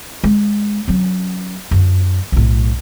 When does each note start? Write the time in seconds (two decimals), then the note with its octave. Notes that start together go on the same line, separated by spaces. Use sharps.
0.24 G#3
0.88 F#3 C#4
1.71 F#2 D3
2.32 B1 A2